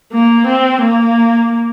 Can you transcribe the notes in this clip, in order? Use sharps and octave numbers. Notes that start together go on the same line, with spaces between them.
A#3
C4
A#3